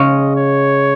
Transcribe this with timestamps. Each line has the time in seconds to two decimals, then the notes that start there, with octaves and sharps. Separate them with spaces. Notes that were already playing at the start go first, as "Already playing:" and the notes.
Already playing: C#3 G#3 C#4 D#5
0.36 C#5